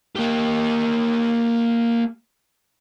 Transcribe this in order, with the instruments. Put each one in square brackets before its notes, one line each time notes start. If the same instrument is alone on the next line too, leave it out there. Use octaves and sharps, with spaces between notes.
[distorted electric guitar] A#3 G4